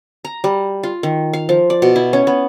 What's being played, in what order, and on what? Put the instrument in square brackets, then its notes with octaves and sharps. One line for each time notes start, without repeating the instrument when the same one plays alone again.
[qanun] A#5
G3
F4
D#3
F5
F3
D5
B2
E4
C#4
B3